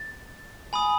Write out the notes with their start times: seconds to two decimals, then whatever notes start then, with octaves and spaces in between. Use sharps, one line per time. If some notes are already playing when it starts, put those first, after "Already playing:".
Already playing: A6
0.73 G#5 B5 D#6